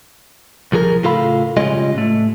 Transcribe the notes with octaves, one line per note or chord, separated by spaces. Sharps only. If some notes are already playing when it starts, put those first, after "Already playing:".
C2 F3 G#4 A#4
A2 C#3 F4 A4 F5 B5
C#3 G3 G#3 C#4 F4 D#5
A2 A3